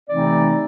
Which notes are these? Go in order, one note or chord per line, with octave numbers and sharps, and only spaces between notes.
C3 E3 A3 C4 D#4 D5